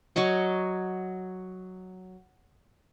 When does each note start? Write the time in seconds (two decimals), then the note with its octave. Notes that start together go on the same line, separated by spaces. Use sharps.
0.16 F#3 C#5 D#5 C#6